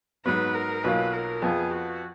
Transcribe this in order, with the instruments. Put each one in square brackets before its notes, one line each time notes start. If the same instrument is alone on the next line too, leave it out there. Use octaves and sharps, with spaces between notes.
[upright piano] G#2 F#3 B3 [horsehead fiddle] B4
[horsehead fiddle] A#4
[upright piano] B1 B2 F#3 A#3 F4 [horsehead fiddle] B4
[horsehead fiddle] A#4
[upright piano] F2 F3 B3 F4 [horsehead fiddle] G#4
[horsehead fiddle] F#4